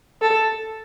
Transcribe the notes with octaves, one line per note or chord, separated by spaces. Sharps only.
A4